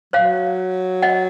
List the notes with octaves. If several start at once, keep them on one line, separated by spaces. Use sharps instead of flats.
F#3 C#5 F5
D#5 F#5